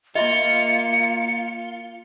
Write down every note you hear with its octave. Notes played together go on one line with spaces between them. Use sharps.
A#3 F4 D#5 E5 C6 C#7